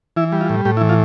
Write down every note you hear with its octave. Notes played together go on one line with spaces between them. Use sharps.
E3 E4
G3
F4
A2
A2 G4
E4
E3
F4